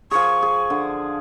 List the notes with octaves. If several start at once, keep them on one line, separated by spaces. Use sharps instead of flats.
F3 G#4 C#6
G#4
D3